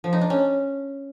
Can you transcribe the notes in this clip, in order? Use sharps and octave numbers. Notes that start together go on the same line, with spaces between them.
F3
D#4
D4
C#4